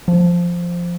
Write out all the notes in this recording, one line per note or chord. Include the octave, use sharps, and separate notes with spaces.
F3